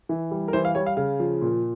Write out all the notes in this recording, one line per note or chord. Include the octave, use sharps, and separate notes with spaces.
E3
G3
A#4
E3 C5
F5
G3 C#5
F5
C#3 F5
F3
A#2